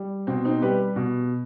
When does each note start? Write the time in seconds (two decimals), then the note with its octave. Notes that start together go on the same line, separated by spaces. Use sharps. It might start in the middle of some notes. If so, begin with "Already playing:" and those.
Already playing: G3
0.27 B2 C4
0.45 C4 D#4
0.62 G3 G4 B4
0.96 B2